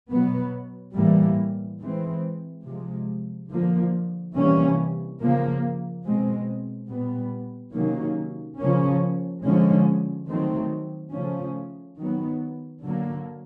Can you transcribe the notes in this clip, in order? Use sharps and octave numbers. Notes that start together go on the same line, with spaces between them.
B2 F#3 B3
A2 E3 G3 A#3
E3 G#3 C4
C3 F3 G#3
D3 F3 A#3
C3 E3 G3 A#3 C#4
C#3 F3 A#3
B2 G#3 C4
A#2 G3 B3
C3 D#3 F#3 A#3 C#4
C#3 F3 A#3 C#4
D3 F3 G#3 C#4
D#3 F#3 A3 C4
C#3 F3 A3 C#4
D#3 F#3 B3
D3 F#3 A#3